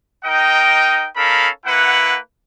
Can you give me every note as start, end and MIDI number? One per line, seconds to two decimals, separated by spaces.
0.25 1.07 63
0.25 1.07 70
0.25 1.07 75
0.25 1.07 79
1.16 1.48 61
1.16 1.48 63
1.16 1.48 69
1.16 1.48 70
1.16 1.48 77
1.16 1.48 83
1.66 2.17 58
1.66 2.17 64
1.66 2.17 71
1.66 2.17 78